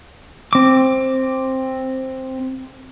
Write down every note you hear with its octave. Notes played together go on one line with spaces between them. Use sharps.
C4 D6